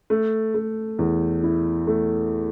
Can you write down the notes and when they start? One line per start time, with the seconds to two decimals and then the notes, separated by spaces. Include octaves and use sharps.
0.10 A3
0.55 A3
0.99 E2
1.43 E4
1.87 A3